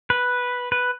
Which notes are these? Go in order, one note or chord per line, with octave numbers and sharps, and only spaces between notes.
B4
B4